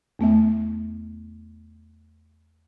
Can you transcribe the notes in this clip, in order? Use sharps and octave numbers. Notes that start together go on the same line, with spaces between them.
E2 A3 B3 E5